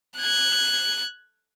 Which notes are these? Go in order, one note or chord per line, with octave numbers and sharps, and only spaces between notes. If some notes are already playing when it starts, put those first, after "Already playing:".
F#6 G#6